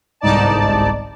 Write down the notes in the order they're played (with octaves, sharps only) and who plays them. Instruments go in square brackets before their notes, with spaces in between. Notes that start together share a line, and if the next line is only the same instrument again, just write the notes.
[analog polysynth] G1 C2 G#2 D#4 D5 A5